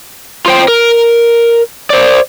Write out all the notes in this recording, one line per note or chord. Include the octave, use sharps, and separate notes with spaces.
F4 C5 G5
A#4
C5 D5